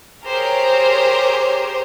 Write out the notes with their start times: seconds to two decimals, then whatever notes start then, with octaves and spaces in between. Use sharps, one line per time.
0.25 G4 G#4 A#4 C5 C#5